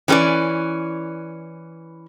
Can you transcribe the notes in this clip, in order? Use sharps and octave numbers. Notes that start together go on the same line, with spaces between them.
E3 C#4 G4 B4 D5